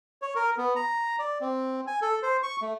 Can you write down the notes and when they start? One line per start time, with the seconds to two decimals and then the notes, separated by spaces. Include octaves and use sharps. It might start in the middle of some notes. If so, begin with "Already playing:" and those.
0.22 C#5
0.35 A#4
0.58 B3
0.76 A#5
1.19 D5
1.41 C4
1.87 G#5
2.02 A4
2.23 C5
2.43 C#6
2.62 A3